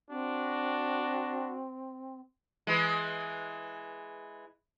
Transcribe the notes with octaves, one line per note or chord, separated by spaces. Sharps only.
C4 D4 F#4
E3 G#3